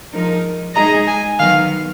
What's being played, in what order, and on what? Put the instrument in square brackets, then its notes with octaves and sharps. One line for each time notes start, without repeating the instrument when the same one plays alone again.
[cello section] F3 G#3 D#4 A#4
[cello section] G#3 D#4 G#4 D#5 [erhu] A#5
[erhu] G#5
[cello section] D#3 F#3 B3 [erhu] F5